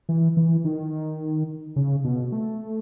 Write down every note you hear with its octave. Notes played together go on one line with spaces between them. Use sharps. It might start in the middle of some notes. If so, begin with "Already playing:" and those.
E3
E3
D#3
C#3
B2
A3